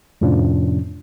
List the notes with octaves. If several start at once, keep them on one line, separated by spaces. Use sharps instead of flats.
F2 A2 C3 F3 C#4 D4